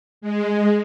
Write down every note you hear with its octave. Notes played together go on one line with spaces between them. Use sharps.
G#3